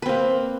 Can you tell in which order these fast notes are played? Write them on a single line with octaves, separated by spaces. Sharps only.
B4 C4 A#3